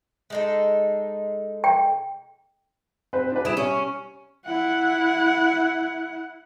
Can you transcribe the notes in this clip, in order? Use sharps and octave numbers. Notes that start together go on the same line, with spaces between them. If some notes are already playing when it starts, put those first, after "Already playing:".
G#3 D#4 A4
G5
C4 B4 C5
D4 B4
G3 E4 G#4 D7 E7
C#4
E4 F#5